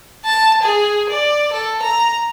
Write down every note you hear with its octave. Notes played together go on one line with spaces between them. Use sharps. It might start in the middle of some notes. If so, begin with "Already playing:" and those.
A5
G#4
D5
A4
A#5